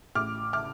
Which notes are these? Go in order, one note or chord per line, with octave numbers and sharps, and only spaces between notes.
A1 D6 F6
D6 F6